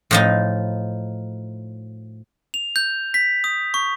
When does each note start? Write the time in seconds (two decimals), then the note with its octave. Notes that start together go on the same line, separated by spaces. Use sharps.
0.11 A2 F3 D#4
2.54 F7
2.76 G6
3.14 B6
3.44 D#6
3.74 C#6